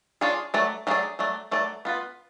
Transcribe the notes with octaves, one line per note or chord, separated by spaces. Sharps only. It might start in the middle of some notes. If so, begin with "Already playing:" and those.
D4 F4 G#4 C#5
F#3 A3 D5
F#3 A3 C#4 G#4 D5
F#3 A3 D5
F#3 A3 D5
B3 F4 B4